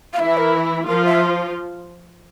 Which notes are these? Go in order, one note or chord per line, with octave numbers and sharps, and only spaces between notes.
F5
E3 E4 E5
A#4
F3 F4 A#4
E5